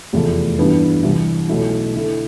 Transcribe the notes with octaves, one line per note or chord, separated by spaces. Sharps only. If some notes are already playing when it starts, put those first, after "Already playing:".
F1 E2 C3 F3 A3
G2 E3 G3 B3 D4
C2 C3 E3
B1 B2 A3 E4
D3 A3 E4 A4